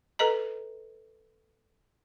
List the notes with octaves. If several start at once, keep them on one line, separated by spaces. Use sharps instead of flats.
A4 B4 D#5 A#5